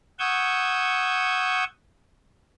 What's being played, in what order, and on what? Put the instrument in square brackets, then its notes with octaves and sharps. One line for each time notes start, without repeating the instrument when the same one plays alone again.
[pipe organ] F#5 C#6 D#6 E6 G6 G#6